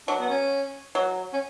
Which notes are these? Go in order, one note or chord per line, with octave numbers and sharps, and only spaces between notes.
F#3 D4
B3
C#4
F#3
C#4